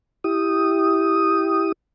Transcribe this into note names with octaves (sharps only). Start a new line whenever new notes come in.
E4 G4 D#6